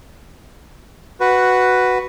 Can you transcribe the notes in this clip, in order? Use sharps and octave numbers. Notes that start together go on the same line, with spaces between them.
F#4 B4